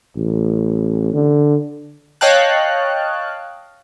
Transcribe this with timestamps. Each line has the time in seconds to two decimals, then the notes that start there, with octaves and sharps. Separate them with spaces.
0.16 A1
1.13 D3
2.21 C#5 D#5 F5 G5 A5 F#6